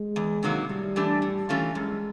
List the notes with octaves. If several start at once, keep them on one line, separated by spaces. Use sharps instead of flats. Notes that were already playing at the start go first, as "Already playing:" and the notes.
Already playing: G#3
E2
C3 D#3 F#3 A#3
A2 G3
E3 A3 D4 G4
A2
E3 A3 C#4 F4
F#2 G#3